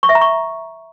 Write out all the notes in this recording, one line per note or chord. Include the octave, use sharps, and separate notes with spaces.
C#6
E5
A#5
C#6